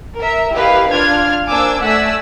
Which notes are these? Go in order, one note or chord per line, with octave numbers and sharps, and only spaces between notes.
A#4 E5
E4 G4 A#4 B4 D#5 F5
D4 F4 D5 F6 G#6
A#3 D4 C5 G#5 D6 E6
A3 D5 F#5 G#5 E6 B6